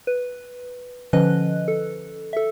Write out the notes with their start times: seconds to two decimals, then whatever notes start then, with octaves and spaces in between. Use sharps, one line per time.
0.07 B4
1.13 D3 F3 C#4 B4 D#5 F#6
1.68 A4
2.33 A4 E5